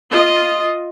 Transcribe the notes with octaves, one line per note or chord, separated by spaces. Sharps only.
F4 D#5